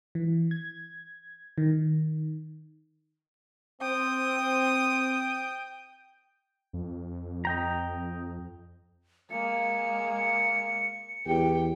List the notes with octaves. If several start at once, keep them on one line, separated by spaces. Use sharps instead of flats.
E3
G#6
D#3
C4 G5 D#6
F2
D#5 G5 A#5
G#3 A#3 C#7
E2 G4 G5